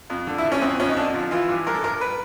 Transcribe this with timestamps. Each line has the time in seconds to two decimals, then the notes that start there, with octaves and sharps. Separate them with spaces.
0.10 F2
0.27 D3
0.38 E4
0.45 D3
0.52 C#4
0.61 F2 C4
0.79 F2 C#4
0.89 D#4
0.97 D3 D4
1.14 F3
1.31 E3 F4
1.49 G2
1.66 G2 A#4
1.75 A4
1.83 G2 A#4
2.01 B4